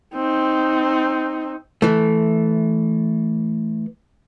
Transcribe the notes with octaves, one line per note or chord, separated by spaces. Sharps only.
C4 D#4
E3 A3